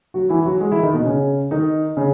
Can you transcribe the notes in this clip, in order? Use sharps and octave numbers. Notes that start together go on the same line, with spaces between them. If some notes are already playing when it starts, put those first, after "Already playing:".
F#3 F#4
E3 E4
F#3 F#4
G#3 G#4
E3 E4
D#3 D#4
B2 B3
C#3 C#4
D#3 D#4
C#3 C#4